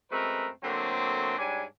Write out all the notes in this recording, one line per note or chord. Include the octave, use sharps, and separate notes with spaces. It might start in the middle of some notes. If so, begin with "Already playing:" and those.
F#2 G#3 A3 C4 A#4 B4
D3 F#3 A3 A#3 C4
G#2 G3 D4 C#5 G#5